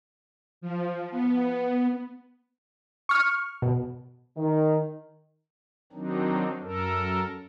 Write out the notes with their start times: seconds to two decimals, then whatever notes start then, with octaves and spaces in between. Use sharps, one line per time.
0.61 F3
1.11 B3
3.09 C#6 F6
3.62 B2
4.37 D#3
5.92 D#3 F#3 C4 D4 D#4
6.61 F#2 A4 A#4